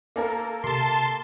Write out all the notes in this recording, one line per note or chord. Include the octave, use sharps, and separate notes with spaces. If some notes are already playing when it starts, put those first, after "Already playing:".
A#3 A4 A#4
C3 A5 C6